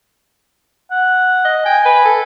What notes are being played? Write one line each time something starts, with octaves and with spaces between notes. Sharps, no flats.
F#5
D#5
G5 G#5
B4
A4